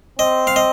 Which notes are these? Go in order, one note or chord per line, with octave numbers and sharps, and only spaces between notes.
C4 D#5
F5
D#5